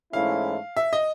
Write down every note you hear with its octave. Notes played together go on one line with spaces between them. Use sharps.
G#2 E3 A3 C#4 E4 F5
E5
D#5